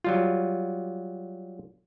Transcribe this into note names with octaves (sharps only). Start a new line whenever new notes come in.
F#3 G3 F4